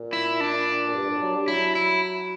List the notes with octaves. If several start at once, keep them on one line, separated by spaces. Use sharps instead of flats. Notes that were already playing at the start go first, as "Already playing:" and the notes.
Already playing: A#2
E4
D4
A#2
G2
A#2
G3
F#3
G3
F#3 E4
E4